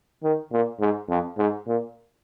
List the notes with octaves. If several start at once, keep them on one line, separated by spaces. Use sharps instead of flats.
D#3
A#2
G#2
F2
G#2
A#2